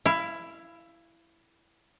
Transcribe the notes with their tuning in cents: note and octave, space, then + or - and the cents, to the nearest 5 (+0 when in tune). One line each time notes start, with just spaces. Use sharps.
E4 +10 F5 -30